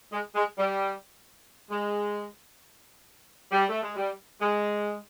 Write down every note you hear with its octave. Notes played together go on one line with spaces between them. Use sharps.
G#3
G#3
G3
G#3
G3
A3
G#3
G3
G#3